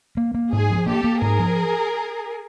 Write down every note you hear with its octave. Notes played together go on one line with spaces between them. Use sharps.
A#3
A#3
G#2 G#4
F3
A#3 G4 A4
A#3
G#2 G#4 A#4
F3